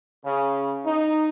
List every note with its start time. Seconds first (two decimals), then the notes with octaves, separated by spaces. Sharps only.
0.24 C#3
0.85 D#4